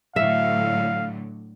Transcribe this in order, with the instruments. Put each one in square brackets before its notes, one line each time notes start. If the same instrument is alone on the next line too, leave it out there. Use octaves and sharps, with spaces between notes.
[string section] A2 D3 F#3 [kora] E5 [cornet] F5